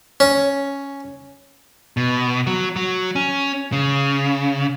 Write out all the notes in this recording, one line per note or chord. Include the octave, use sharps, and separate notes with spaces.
C#4
B2
F#3
F#3
C#4
C#3